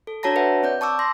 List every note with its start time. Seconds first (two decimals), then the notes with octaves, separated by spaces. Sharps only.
0.07 A4
0.23 D4 F#4 C#5 A5 A#5 A#6
0.36 B4 C#5 E5 F#5
0.63 C4 D5 G6
0.81 A5 C#6 D6 E6
0.99 C6 A#6